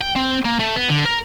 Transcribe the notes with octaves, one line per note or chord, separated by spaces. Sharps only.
G5
C4
A#3
A3
B3
D3
A#4